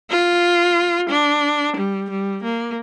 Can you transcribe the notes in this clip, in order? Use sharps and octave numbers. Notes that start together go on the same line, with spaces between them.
F4
D4
G3
G3
A#3